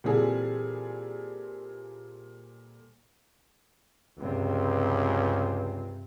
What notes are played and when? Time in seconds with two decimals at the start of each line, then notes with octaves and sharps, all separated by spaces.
0.04 A#2 E3 G3 C4 G#4 A4
4.18 C#2 G2 C3